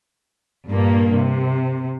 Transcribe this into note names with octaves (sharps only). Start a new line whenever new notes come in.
G2 A#2 A#3
C3